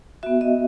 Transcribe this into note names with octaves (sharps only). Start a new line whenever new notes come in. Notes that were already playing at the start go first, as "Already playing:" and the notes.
B3 F#4 E5
D#5